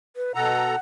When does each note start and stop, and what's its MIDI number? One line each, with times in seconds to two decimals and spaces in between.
0.16 0.33 71
0.35 0.76 47
0.35 0.76 69
0.35 0.79 78
0.35 0.76 82